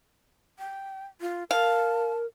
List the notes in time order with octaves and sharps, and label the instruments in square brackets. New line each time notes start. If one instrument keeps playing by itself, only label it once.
[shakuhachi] G5
F4
[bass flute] A#4 [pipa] F5 [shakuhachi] A5